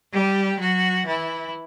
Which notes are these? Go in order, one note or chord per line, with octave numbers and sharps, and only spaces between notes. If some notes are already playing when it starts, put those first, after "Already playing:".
G3 G4
F#3 F#4
E3 E4